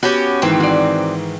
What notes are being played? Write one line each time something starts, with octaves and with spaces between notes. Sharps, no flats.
B3 C#4 F#4 G4
G#2 D#3 E3 C4
F#4 D5